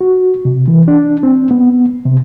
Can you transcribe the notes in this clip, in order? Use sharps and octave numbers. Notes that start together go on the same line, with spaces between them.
F#4
C3
E3
D4
C4
B3
C3